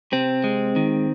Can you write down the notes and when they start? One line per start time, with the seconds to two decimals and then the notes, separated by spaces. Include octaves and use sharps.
0.12 C3 C4
0.44 G#3
0.76 D#3